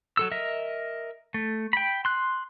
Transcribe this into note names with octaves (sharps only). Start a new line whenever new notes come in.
F#3 A4 E6
A#4 D#5 E5
A3
G5 B5
C6 F#6